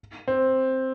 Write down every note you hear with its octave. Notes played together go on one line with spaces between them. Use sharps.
C4